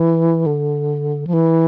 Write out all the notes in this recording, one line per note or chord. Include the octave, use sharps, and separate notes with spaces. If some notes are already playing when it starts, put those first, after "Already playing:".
Already playing: E3
D3
F3
E3